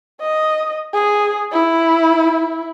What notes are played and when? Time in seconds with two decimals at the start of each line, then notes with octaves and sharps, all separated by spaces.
0.20 D#5
0.94 G#4
1.52 E4